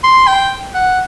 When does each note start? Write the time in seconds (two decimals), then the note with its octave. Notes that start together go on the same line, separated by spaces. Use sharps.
0.04 C6
0.27 G5
0.74 F#5